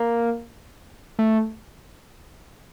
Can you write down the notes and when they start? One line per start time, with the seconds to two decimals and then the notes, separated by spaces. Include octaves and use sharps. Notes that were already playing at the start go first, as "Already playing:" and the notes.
Already playing: A#3
1.19 A3